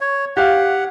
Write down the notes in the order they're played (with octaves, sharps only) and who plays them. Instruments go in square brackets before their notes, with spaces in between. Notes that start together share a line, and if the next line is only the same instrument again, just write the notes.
[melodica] C#5
[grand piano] G4 F5 [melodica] F#5